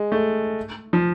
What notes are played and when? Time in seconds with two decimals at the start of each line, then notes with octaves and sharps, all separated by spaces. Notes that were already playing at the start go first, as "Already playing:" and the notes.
Already playing: G#3
0.12 A3
0.93 F3